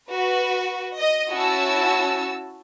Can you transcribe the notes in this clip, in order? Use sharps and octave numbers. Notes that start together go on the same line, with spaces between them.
F#4 B4
D#5
C#4 E4 F#4 A5 E6